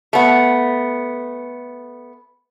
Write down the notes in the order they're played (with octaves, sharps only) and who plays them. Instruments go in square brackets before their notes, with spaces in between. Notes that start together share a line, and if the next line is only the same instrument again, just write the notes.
[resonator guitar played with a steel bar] A3 B3